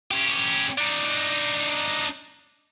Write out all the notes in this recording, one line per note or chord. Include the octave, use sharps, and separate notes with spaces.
C#4 G4
D4 D#4